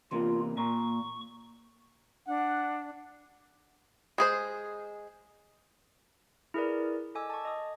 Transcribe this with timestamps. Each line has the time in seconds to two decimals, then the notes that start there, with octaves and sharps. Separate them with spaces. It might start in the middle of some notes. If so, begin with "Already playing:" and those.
0.11 E2 C3 A#3 F4
0.57 A#2 A#5 C#6
2.27 D4 F#5
4.18 G#3 G#4 C5
6.54 E4 G#4 A#4 B4 D5
7.15 A4 D#5 G#5 D6 E6
7.30 A5 C#6
7.45 D#5 D#6